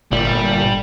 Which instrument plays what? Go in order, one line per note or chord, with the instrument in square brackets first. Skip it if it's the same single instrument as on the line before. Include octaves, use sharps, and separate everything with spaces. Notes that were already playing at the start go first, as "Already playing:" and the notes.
[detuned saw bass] G1 [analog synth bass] A#2 [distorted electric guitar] G3